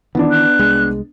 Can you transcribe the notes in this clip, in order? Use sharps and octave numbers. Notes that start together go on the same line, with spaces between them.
D#3 E3 B3 D4
F#6
C2 G#3